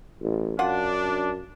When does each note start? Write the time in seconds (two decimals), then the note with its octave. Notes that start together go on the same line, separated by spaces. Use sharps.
0.21 A1
0.59 F#2 D4 F4 F#5